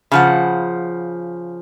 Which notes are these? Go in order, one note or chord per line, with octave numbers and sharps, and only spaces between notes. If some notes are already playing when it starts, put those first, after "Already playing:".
C#3 F3 F#5